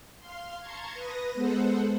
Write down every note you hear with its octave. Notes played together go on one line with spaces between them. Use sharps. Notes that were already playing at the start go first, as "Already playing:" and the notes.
F5 C6
A5 A#5 C6 C#6 G#6
B4 D#6 A#6
G#3 B3 A4 C5 F#5